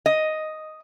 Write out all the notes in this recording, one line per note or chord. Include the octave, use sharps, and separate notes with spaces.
D#5